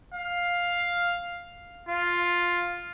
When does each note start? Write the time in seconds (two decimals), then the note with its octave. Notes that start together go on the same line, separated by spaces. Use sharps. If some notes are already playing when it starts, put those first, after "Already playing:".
0.14 F5
1.89 F4